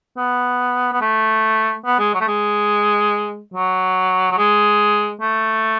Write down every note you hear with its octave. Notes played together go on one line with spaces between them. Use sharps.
B3
B3
A3
B3
G#3
F#3
A3
G#3
F#3
F#3
G#3
A3